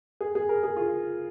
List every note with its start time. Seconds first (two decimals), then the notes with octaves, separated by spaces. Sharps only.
0.21 G#4
0.35 G#4
0.49 A#4
0.63 G#4
0.77 F4